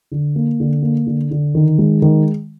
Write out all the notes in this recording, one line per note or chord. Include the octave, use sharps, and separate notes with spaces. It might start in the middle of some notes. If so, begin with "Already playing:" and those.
D3
A#3
D3
A#3
D3
D3
D#3
G#3
D#3